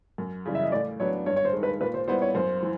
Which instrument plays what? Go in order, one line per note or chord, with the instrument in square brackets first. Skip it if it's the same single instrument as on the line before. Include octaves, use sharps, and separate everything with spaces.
[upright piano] F#2
C#3 E3 G3
[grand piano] E5
D#5
[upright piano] A2 [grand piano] D5
[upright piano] F#3 B3 D4 [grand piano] C#5
[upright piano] G2 [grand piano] C#5
[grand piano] C#5
C5
[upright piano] D#3 G#3
[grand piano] B4
[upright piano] A#2 [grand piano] B4
[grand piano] C5
[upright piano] G3 B3 E4 [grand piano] C5
[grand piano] C#5
[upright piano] F#2 [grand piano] C5
[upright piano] E3